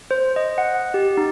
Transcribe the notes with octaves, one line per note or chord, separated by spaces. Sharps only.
C5
D#5
F#5
G4
D#4